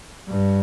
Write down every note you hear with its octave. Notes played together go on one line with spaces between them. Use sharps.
G2